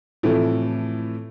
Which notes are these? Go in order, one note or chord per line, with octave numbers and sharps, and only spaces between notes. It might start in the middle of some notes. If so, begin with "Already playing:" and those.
A2 C3 E3 F3 A3